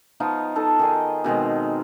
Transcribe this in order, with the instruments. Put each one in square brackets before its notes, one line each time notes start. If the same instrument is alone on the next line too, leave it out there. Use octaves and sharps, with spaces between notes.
[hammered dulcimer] F3 B3 D#4 F4
D#4 A4 F5
D#3 G#4 D#5
B2 D#3 G#3 C4